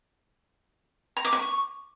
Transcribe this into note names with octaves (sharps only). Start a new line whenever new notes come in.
A#5
D6
C#6